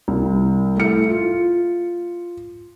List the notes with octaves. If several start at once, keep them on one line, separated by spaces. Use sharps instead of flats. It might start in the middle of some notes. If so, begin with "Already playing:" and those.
C2
A3 E4 C#7
F4